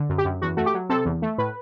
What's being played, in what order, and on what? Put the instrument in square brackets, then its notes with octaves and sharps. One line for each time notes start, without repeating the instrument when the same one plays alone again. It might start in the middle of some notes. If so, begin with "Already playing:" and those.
Already playing: [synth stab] D3
F#2
G4
F#2
E2 F#4
A3 F#4
G4
F#3
C3 A4
E2
A3
A2 B4